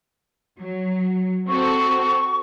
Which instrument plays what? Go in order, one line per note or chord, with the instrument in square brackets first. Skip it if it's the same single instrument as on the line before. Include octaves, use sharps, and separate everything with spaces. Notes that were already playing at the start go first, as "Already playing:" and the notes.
[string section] F#3
[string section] C4 F#4 A4 [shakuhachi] C#6